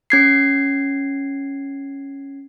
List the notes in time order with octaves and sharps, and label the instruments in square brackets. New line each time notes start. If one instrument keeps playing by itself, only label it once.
[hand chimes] C#4 G#6 C7